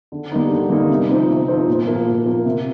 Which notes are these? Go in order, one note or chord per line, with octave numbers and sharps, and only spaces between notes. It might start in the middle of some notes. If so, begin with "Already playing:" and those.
D3
G3 A#3 D#4
D3
G3 A#3 D#4
C3
F3 C4 D#4
C3
F3 C4 D#4
A#2
F3 A#3
A#2
F3 A#3
C3